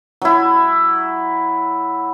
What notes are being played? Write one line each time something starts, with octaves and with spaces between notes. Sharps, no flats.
F#3 E4